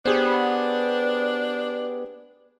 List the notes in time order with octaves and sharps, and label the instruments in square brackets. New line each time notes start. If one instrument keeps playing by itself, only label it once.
[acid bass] B3 [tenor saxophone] D4 [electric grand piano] G4 G#4 C5